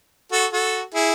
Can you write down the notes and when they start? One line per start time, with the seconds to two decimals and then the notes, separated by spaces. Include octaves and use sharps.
0.32 F#4 A4
0.53 F#4 A4
0.94 E4 G#4